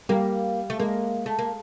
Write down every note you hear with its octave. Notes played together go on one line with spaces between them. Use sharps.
G3 A#3
A3
G#3 A#3
A3
A#3